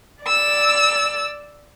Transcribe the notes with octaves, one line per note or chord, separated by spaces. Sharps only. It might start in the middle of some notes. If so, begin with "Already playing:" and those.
D5 E6